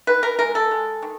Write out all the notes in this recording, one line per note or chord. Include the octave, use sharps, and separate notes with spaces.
D#3 B4
A#4
G#3 A#4
A4
G#3
D#3